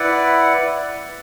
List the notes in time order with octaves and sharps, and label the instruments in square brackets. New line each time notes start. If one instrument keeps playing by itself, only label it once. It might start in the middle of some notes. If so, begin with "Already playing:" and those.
Already playing: [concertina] E4 B4 D5 F#5